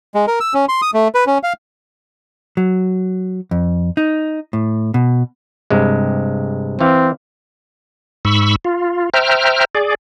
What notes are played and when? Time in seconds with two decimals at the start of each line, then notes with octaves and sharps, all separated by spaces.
0.15 G#3
0.28 A#4
0.40 E6
0.54 C#4
0.69 C6
0.82 D#6
0.94 A3
1.15 B4
1.27 C#4
1.43 F5
2.57 F#3
3.51 F2
3.97 D#4
4.53 A2
4.94 B2
5.70 G2 C3 G#3
6.81 E3 C4 F5
8.25 G#2 B5 C#6 E6
8.65 F4
9.14 C5 E5 G5 A#5 F6
9.75 G#4 D5